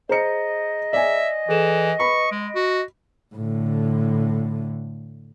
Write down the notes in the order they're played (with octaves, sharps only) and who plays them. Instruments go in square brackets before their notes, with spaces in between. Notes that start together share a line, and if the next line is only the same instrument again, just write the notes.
[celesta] G#4 A#5 [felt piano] C5 C#7 [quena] D#5
[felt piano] D5 G#5 [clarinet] E5
[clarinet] E3 [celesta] G#4 A4 E7
[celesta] B4 [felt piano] B5 [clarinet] C#6
[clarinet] G#3 [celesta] D7
[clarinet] F#4
[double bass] A2 D3